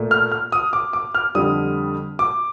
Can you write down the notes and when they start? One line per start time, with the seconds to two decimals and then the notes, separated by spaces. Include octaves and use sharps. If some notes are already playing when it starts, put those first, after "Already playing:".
Already playing: A#2 A3
0.11 F6
0.32 F6
0.52 D#6
0.73 D6
0.93 D6
1.15 F6
1.35 F2 D3 G3 D#6
2.19 D6